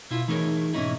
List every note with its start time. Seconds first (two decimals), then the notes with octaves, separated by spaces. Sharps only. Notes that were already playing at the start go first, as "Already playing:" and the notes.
0.11 B2 E4 F4
0.28 E3 A3 D#4 G#4 A#4 C#5
0.73 G#2 B2 E3 C#4 D#4 E4